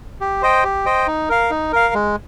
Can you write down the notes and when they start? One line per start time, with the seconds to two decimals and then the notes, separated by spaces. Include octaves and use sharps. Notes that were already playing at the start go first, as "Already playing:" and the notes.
0.21 G4
0.42 C5 D#5 G5
0.64 G4
0.86 C5 D#5 G5
1.07 D#4
1.29 A#4 F5
1.50 D#4
1.73 A#4 F5
1.94 G#3